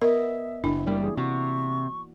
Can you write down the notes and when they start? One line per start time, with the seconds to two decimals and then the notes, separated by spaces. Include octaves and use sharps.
0.02 B3 A#4 D#5 E5
0.64 F#1 D4 E4
0.87 F#1 G3 A#3 A#4 D5
1.01 E3 G#4
1.17 C3 F#4 C#6